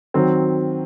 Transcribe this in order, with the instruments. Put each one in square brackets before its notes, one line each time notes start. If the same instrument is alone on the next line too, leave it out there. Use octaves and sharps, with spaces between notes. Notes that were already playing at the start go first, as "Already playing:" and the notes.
[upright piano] D#3 F#3 C4